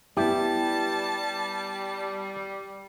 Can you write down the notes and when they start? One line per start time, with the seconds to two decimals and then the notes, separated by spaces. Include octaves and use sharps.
0.17 G3 B3 E4 G4 A5